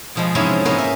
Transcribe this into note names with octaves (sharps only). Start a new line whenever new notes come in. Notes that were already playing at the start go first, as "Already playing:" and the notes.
B2 F3 G#3
G#2 C3 F3 B3 C#4 E4
A#3 B3 C#4 G#4 A#4
E5